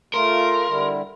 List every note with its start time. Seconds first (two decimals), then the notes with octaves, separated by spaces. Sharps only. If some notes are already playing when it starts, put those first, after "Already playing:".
0.14 A3 F4 A#4 C6
0.68 D3 G3 E4